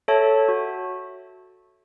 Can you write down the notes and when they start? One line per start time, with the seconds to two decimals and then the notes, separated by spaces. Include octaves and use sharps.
0.08 A4 C#5 E5 A5
0.48 F#4